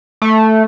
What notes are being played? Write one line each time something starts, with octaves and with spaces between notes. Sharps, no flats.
A3